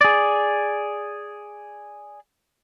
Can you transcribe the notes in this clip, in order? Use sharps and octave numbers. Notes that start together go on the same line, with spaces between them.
G#4 D5